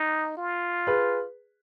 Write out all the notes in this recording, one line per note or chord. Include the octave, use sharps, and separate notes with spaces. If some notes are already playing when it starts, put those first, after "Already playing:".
Already playing: D#4
F4
G#4 B4